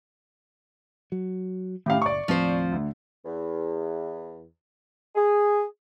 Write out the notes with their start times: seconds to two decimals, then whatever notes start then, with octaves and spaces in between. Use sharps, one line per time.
1.12 F#3
1.86 A2 D#3 C#4 G4 F5
2.02 F#1 D5 C#6
2.28 D#2 A2 F3 C4 C5
2.72 D2
3.25 E2
5.16 G#4